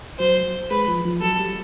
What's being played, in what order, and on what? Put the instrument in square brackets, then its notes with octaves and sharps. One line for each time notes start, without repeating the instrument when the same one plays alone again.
[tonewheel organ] F#3 [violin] C5
[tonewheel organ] G#3 [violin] B4
[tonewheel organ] F3
F3
[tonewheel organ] F#3 [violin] A4
[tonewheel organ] G3